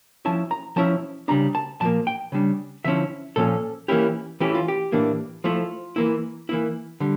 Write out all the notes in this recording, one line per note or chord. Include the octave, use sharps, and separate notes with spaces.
F3 C#4 E4 A5
A#5
F3 C#4 E4 A5
C#3 G3 D4 A#5
A5
A#2 F3 A#3 A5
G5
C#3 G3 D4
D3 F3 C#4 E4 E5
A#2 F3 C#4 A4
E3 A#3 C#4 E4 G4
E3 A3 C#4 E4 G4
F4
G4
A2 E3 A#3 D4
F3 A3 E4 F4
E3 A#3 E4
E3 A#3 E4
D3 G3